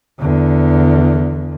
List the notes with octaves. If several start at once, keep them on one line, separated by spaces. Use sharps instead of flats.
E2 D3